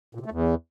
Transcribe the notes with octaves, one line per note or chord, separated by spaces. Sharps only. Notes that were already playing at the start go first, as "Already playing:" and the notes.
A#2
C3
A3
E2